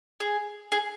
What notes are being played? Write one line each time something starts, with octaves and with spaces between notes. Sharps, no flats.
G#4
G#4